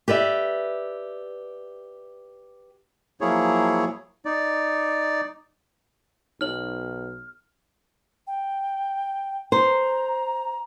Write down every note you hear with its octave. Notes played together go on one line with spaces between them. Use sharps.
G4 B4 D5 E5
F3 F#3 A#3 E4 G#4 C#5
D#4 D5
B1 D#4 C#5 F6 F#7
G5
C5 A#5